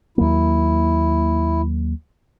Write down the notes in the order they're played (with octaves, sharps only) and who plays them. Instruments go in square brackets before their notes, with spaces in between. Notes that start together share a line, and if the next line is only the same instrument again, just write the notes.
[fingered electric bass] D#2 F#3 A#3 [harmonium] E4